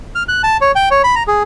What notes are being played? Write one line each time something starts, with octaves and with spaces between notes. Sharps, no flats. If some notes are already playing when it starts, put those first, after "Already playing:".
F6
F#6
A5
C#5
G5
C#5
B5
A#5
G#4